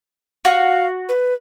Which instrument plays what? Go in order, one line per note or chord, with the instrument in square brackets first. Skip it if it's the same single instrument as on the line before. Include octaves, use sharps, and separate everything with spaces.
[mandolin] F#4 [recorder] F5
[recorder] B4